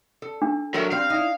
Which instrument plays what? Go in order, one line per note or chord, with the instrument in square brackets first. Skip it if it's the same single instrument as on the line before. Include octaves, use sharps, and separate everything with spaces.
[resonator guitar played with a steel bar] A4
[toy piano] D4
[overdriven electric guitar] F#3 [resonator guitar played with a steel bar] A4 A#4 E5
[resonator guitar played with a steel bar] G3 C4 [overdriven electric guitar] F5
[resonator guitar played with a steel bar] D#4 E4